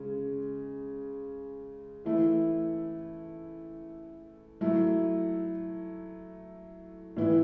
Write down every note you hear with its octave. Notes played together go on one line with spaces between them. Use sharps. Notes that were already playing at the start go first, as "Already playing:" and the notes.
Already playing: C#3 G#3 C#4
E3 A3 E4
F#3 A3 E4
A2 E3 B3 E4